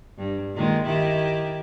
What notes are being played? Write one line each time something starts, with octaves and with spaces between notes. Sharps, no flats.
G2
A#2 D#3 G#3
D#3 E4 G4